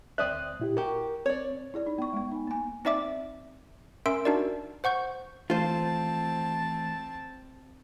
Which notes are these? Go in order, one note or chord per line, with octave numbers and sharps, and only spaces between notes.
D2 C4 D5 E5 D#6 F#6
A#2 E4 G4
F#4 G4 A#4
C4 C#5 D5
E4 G#4 D5
D#4
B3 C#6
G#3 B3
D#4 G#5
A#3 G#5
C4 D#4 D5 E5 D6
C#4 A#4 E5 C6 E6 D7
D4 D#4 F#4 A#4 D5
C5 F#5 C#6 G6
E3 A3 C4 F4 C5 A5